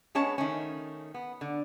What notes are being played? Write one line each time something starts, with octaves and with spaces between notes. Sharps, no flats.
G#3 B3 C#4 C#5 A5
D#3 A3 C#4
B3
D3